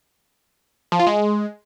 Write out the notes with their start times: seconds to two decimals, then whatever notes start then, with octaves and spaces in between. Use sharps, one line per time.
0.92 F3
0.99 F4
1.07 G#3